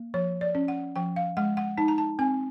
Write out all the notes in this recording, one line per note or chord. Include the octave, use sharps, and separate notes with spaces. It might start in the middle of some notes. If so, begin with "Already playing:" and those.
Already playing: A#3
F3 C#5
D5
C#4
F#5
F3 G5
F5
G#3 F#5
F#5
D#4 A5
A#5
A5
C4 G#5